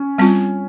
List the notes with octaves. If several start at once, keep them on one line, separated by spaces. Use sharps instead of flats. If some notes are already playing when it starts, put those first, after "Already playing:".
Already playing: C#4
G3 C4 F4